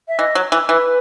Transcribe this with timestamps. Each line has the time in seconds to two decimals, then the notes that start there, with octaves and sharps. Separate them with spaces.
0.08 E5
0.19 E3 D#5
0.35 F#3
0.52 E3
0.69 E3 B4